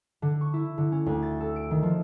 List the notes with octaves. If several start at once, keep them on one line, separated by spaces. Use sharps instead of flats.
D3
C#6
E4
D3
C#4
D2
A6
A4
D7
D#3
F3